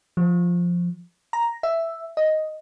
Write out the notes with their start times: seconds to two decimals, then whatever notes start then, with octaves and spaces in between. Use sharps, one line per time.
0.17 F3
1.33 A#5
1.63 E5
2.17 D#5